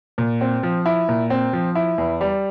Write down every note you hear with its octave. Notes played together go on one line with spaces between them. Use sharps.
A#2
C4
F3
E4
A#2
C4
F3
E4
E2
G3